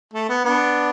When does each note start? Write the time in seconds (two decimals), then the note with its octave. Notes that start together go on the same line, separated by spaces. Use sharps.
0.14 A3
0.29 B3
0.45 B3 D4